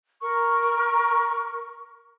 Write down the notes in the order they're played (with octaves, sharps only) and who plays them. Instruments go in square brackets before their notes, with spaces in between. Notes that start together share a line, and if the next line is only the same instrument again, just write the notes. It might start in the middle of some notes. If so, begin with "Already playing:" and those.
[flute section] A#4 C#6